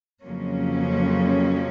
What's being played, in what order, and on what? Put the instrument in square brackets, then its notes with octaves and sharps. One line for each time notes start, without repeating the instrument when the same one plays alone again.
[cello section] F2 C#3 F#3 A#3 C#4